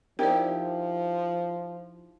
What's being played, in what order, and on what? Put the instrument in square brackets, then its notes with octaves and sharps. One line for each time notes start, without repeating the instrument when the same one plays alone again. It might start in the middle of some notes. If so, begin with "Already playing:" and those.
[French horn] F3 [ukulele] D#4 E4 G4 [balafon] A#4 C5 D5